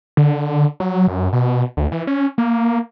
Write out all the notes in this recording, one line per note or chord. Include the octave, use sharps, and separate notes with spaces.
D3
F#3
F#2
B2
D2
E3
C#4
A#3